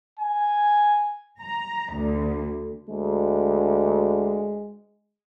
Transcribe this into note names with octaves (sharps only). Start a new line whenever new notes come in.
G#5
A#5
D2
D2 G#3